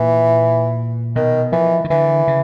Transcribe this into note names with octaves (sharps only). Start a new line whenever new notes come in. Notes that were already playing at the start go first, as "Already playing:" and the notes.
Already playing: A#2 E3
B2 D#3
E3 F3
D#3
D3 E3
C#3